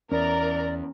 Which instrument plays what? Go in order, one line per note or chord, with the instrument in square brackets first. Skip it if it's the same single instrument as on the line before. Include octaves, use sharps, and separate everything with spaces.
[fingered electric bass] E2 [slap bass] C#4 [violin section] A#4 [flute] D5